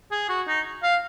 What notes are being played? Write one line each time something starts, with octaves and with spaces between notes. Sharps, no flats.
G#4
F#4
D#4
F5